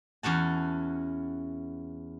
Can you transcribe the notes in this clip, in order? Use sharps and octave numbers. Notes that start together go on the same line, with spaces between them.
E2 C#4 F#4 A5